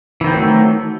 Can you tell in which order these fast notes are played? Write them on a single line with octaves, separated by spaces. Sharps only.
E3 D#3 C4 F#3 A3